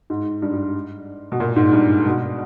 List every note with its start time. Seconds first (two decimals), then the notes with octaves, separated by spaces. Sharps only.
0.10 G#2
0.42 G2
0.53 G2
1.32 B2
1.40 A#2
1.56 G#2
1.73 G2
2.06 B2